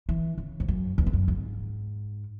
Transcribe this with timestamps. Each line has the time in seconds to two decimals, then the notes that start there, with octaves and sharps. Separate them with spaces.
0.09 E3
0.38 C#3
0.60 G#2
0.68 F#2
0.98 E2
1.07 G#2
1.13 F#2
1.28 G#2